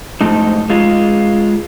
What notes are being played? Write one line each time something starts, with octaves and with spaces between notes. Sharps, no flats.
F2 G#2 A3 D#4
G#3 F4